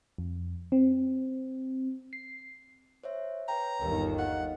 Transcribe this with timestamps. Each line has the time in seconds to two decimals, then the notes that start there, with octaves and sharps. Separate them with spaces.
0.18 F2
0.72 C4
2.13 C7
3.04 C5 C#5 E5
3.48 B4 C#5 G5 A#5
3.82 G1 D#2 D#3 A#4
4.18 D#5 F5 F#5